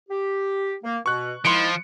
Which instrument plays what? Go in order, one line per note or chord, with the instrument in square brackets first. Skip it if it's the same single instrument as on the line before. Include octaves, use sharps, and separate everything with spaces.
[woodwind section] G4
A#3
[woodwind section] B2 [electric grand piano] C#6 F#6
[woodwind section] D#3 G#3 E4 [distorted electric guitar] F3 [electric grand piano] C6 C#7 D7